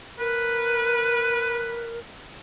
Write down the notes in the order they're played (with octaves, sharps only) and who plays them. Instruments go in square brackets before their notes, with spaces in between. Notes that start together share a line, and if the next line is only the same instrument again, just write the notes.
[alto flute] A#4 [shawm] B4